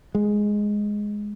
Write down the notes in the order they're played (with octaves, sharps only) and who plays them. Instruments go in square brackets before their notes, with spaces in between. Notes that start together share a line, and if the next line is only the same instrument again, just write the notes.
[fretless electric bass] G#3